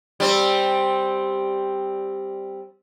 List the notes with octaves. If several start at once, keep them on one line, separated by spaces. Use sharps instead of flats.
G3 C4